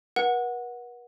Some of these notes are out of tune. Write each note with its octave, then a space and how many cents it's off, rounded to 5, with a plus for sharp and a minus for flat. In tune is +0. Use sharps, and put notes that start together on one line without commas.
B4 -45 F#5 -10